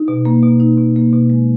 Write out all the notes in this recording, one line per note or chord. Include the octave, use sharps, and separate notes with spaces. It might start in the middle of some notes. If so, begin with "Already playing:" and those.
Already playing: D#4
B2
A#3
B2
D#4
B2
A#3
B2
G#3